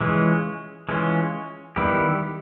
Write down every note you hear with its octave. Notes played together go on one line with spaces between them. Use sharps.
E3 G#3 C#4 F4
E3 G#3 C#4 F4
D#3 G3 B3 E4 G4